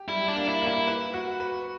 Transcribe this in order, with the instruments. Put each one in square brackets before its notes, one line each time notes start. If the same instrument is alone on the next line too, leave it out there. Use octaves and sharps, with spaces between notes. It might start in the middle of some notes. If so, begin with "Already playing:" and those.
Already playing: [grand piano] G4
[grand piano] G3 [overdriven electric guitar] E4
[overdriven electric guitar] D4
[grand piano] A#3
[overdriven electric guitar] E4
[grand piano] A#3
[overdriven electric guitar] E4
[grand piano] B4
F#4
B4